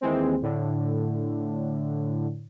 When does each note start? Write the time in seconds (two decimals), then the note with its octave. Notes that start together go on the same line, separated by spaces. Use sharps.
0.01 D#2 E3 G#3 C4
0.42 A2 D3